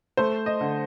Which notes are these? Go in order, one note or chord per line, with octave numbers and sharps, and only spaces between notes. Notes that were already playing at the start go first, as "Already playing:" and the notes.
A3 C5
D#5
D3